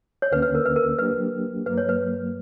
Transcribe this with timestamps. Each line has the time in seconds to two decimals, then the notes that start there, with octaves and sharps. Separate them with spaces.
0.22 C#5
0.31 D2 D3 A#3 C#4 B4
0.42 B4
0.55 A#4
0.66 B4
0.76 A#4
0.99 F#3 A#3 D4 G4 B4
1.66 G2 F#3 A#3 B4
1.78 C#5
1.89 B4